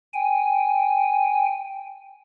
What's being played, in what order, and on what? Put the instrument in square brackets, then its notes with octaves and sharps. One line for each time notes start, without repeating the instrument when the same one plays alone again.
[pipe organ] G5 G#5